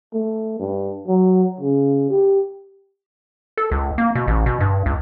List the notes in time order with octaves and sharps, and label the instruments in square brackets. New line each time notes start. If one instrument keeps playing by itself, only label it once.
[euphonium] A3
G2
F#3
C#3
G4
[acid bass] A4
C#2
A#3
B2
A1
B2
G2
C#2